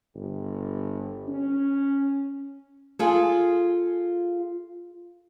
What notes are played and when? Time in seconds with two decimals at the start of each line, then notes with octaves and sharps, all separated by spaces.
0.15 G1
1.28 C#4
2.99 F4 G#4 A4